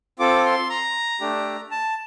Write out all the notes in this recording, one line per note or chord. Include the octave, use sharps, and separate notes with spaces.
C4 F4 A4 D6
C6
A#5
A3 D4 G4
A5